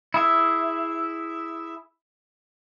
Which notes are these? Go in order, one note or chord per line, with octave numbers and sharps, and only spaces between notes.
E4 G#4 E5